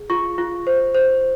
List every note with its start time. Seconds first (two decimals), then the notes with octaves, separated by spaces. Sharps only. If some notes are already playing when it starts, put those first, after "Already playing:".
Already playing: G#4
0.10 F4 C#6
0.38 F4
0.67 C5
0.95 C5